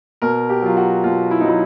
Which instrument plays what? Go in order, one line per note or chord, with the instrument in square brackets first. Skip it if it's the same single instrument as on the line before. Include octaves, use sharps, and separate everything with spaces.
[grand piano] B2 A#4
G4
F#3 F4
F#4
B2 F4
E4
D#4
F#3 E4